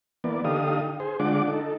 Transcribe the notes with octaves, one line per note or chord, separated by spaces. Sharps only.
E3 A#3 B3 D5
D3 D#4 G4 A4 F5 D#6
G#4 C5
D3 G#3 D4 F4 F#5 D6
D#4 A4